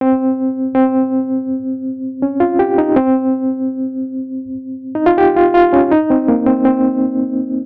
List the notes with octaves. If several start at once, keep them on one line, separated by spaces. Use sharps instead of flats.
C4
C4
C#4
F4
G4
D#4
C4
D#4
F4
G4
F4
F4
C#4
D#4
C4
A#3
C4
C4